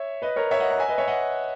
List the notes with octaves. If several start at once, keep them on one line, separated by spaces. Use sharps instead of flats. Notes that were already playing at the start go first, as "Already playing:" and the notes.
Already playing: C#5 E5
B4 D#5
A#4 C#5
C#5 E5
D#5 F#5
F#5 A#5
E5 G#5
B4 D#5
C#5 E5
D#5 F#5